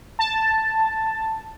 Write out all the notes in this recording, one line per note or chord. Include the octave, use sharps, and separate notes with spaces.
A5